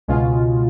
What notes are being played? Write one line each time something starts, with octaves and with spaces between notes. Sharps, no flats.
C#2 B2 G#3 C#4 F4